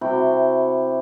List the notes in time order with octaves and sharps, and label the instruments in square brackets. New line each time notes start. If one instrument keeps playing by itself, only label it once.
[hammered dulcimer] C3 E4 F#4 G5